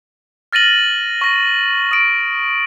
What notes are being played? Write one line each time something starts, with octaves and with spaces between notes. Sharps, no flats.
F6 A6 A#6 D#7 F#7
C#6 A#6
D#6 D7